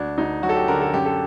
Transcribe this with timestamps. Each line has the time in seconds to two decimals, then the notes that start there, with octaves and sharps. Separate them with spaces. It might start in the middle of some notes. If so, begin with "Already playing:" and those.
Already playing: D2 D4
0.17 D2 D#4
0.42 F#3 F#4
0.49 A4
0.56 G4
0.68 D3 A#4
0.81 A4
0.93 F#2 G4
1.06 A4